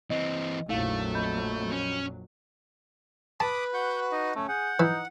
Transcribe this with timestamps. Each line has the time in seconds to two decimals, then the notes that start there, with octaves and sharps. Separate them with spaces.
0.10 E3 C4 D#5
0.69 A#1 F2 F#3 A3 D#4 E4 F5
1.15 D#5 B5 G6
1.71 C#4
3.40 B4 A5 B5 D6 D#6
3.74 F#4 F#5 G6
4.12 D#4 D#5
4.36 A3 C#4
4.48 G#4 F#5 G6
4.80 E3 D#4